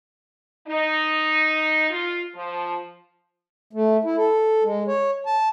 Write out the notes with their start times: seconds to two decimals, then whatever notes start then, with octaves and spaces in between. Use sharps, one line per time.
0.67 D#4
1.91 F4
2.35 F3
3.73 A3
4.05 E4
4.17 A4
4.64 G#3
4.88 C#5
5.26 A5